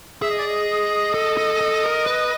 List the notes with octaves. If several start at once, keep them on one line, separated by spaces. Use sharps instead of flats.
G#4 E5
D#5
D5
D#5
A4
A4
A4
A#4
B4